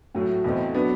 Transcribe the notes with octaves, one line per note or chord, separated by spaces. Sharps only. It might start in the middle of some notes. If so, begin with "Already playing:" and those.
A2 F#3 A3
E2 B2 A3 C4
F#3 B3 D4